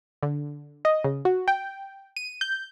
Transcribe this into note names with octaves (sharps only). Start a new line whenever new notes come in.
D3
D#5
C#3
F#4
G5
D#7
G6